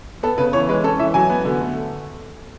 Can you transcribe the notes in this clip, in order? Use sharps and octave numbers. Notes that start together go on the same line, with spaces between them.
B3 A4
C#3 B4
E3 C#5
G#3 B4
C#4 A4
E3 E5
F#3 G#5
B3
D3
A3